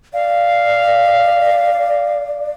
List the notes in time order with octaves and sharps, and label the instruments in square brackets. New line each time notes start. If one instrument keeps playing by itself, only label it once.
[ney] D5 [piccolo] F5